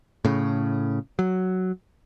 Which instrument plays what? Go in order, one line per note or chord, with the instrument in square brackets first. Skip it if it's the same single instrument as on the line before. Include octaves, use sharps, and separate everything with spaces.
[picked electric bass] A2 C#3
F#3